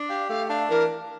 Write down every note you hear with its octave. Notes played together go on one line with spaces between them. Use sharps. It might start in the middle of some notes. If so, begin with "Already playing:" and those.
Already playing: D4
G4 F5
A3 F5
D4 F5
E3 A#4